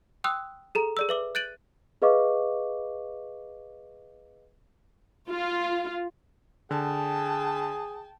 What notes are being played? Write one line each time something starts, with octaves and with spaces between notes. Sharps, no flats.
G5 C6 D#6 E6 F#6
G#4 A4 A#5
G#4 D5 E6
B4 E5 D6
F#6 G6 A6 D7 D#7 F#7
G#4 B4 D#5 F5 C#6 D6
F4
D3 G#4 G5 A5